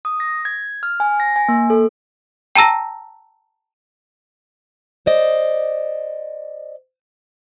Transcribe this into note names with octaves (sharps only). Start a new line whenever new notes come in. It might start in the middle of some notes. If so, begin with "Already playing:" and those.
D#6
A#6
G#6
F6
G#5
A#6
G#5
A#3
A4
G5 A5 A#5 E6 A#6
C5 D5 D#5